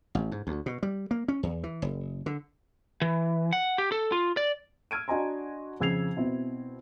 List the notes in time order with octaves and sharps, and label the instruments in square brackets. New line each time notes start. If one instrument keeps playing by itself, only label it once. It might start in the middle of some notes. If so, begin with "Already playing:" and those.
[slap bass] A1
G#2
D2
B2
G3
A#3
C#4
E2
E3
F#1
D3
[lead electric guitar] E3
F#5
G4
A4
F4
D5
[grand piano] E6 F6 G#6 D7 D#7
D4 F#4 D#5 G#5 A#5 C6
F2 C#3 E6 G#6 C7 F7
B2 C4 E4